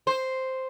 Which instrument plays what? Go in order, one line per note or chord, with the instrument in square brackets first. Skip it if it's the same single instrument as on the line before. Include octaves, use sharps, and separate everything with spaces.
[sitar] C5